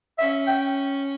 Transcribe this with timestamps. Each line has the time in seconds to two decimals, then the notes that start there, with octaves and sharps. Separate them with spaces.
0.19 C#4 E5
0.48 G5